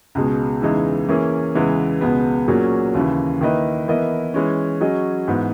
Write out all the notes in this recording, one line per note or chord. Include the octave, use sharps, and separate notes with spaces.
C#2 B2 G#3
E2 C#3 E3 G#3 D#4
E3 A#3 C#4 G#4
E2 C#3 E3 G#3 B3
C#2 B2 G#3 B3
A#2 F#3 A#3 C#4 G#4
D#2 C#3 E3
D#3 A#3 E4 B4 D#5
E3 B3 E4 A#4 D#5
E3 G#3 C#4
F#3 C#4 G#4 D#5
G#2 E3 B3